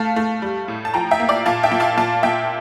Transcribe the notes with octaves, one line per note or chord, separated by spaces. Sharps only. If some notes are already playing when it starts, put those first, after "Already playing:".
Already playing: A3 F5 A5
A3
G3
A2
A5
F3 G5 A#5
E5 G5
A#3
D5 F5
A#2 F5 A5
E5 G5
A#2
F5 A5
A#2 F5 A5
A#2 E5 G5